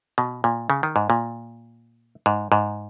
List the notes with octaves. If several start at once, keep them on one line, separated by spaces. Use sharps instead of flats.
B2
A#2
C#3
D#3
G#2
A#2
G#2
G#2